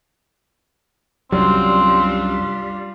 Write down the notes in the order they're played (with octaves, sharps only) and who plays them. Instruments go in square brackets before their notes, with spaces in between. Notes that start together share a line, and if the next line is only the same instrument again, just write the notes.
[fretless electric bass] C2 F#2 F#3 [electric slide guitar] G3 [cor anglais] C4 [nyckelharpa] D4 F4